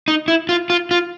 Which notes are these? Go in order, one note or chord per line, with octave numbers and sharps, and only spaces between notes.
D#4
E4
F4
F4
F4